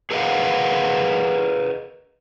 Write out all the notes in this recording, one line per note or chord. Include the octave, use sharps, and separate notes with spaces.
G#4 A#4 B4 D#5 F5 F#5